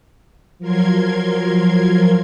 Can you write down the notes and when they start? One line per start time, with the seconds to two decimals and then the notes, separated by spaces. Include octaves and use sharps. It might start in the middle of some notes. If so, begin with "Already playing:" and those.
0.59 F3 F#3 A#4 C6 G#6